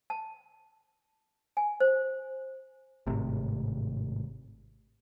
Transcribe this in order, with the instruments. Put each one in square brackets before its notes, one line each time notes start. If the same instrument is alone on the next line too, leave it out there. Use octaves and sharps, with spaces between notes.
[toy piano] A5
G#5
C5
[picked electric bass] G#1 A2 C3